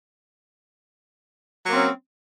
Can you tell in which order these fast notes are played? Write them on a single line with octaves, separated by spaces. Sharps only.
F#3 A#3 C4 C#4